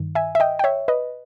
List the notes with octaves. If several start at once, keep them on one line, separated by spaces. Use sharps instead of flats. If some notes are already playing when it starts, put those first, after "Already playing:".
Already playing: G2 D#3
E5 G#5
E5
D#5 G5
G5
C#5 E5
B4 D#5